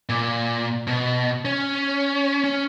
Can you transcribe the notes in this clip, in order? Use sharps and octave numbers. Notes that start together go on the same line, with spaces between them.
A#2
B2
C#4
C#4